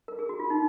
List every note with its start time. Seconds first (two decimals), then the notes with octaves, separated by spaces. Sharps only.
0.08 A#4
0.19 G#4
0.29 F#4
0.40 F4
0.50 D#4